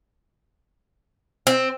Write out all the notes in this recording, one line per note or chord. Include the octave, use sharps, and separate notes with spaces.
C4